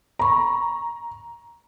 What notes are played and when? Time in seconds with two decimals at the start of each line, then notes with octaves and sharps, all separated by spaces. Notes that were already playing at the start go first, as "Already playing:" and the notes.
0.19 A#5 B5 C#6